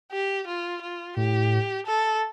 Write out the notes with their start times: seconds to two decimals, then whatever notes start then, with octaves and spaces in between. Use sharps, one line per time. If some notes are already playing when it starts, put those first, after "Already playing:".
0.12 G4
0.47 F4
0.82 F4
1.17 A2 G4
1.86 A4